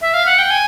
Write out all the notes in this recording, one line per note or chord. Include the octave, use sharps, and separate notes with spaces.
E5
F5
F#5
G5
G#5